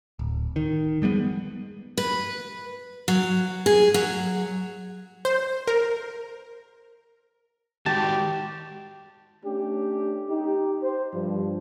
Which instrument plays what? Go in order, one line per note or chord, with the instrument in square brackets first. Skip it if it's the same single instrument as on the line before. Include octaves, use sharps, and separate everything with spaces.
[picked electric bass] D1
D#3
F3 G3 G#3 B3
[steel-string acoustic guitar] B4
F#3
G#4
F#3
[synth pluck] C5
A#4
[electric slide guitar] D#3 G#3 F#4 [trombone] G4 [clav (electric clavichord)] A5
[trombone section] A3 C#4 D4 G4
D#4 G4
C5
G2 F3